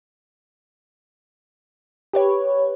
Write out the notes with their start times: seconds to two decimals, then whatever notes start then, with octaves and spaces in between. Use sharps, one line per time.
2.13 G4 B4 C#5